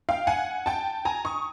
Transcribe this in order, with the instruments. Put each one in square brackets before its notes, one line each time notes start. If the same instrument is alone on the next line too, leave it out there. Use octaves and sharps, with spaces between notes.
[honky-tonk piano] F5 G5
F#5 G#5
G5 A5
G#5 A#5
C#6 D#6